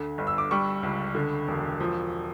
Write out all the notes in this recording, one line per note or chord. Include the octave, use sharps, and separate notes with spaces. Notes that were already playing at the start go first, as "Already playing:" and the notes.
Already playing: D2 D3
G1
E6
D6
G3 C#6
C#2
D3
E1
F3